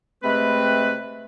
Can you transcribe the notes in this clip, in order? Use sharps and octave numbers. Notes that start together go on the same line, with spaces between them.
C3 G#3 A3 C4 B4